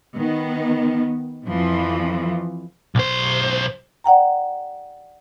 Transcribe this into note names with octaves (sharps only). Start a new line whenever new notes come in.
D#3 B3
F2 E3 F3
B1 C5
D5 F#5 G5 A#5